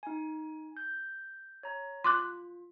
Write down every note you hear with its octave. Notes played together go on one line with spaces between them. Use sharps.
D#4 G#5
G6
C#5 A#5
F4 C6 D6 F#6